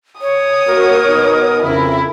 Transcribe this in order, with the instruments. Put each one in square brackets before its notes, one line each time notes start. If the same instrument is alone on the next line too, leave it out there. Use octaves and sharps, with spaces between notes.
[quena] C#5 [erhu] D#6
[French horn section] A#3 F#4 [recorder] A#4
[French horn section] B2 B3 D#4
[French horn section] F2 C#3 [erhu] E4 [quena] A#4